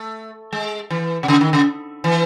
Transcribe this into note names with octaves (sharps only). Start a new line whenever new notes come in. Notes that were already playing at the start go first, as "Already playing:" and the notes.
Already playing: A3
G#3
E3
C3
C#3
D#3
C#3
E3